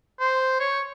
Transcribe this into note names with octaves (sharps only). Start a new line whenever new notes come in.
C5
C#5